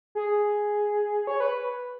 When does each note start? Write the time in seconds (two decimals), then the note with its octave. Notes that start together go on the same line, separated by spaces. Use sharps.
0.15 G#4
1.27 C#5
1.40 B4